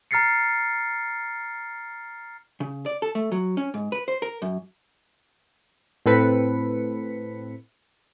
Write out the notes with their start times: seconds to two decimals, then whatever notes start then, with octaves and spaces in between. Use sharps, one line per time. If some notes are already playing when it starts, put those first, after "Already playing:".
0.11 A#5 F6 A6 C7 C#7
2.60 C#3
2.86 D5
3.02 A4
3.15 A3
3.32 F#3
3.57 C#4
3.74 G#2
3.92 B4
4.08 C5
4.22 A#4
4.42 F#2
6.06 A2 C4 A4 B4 B6 C#7